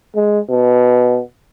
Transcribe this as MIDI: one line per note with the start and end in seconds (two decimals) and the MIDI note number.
0.16 0.40 56
0.50 1.21 47